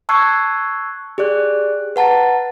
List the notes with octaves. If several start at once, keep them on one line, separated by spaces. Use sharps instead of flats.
A5 C#6 E6 F#6 G#6 C7
G4 G#4 D5 F#6
B4 F#5 A5 A#5 A6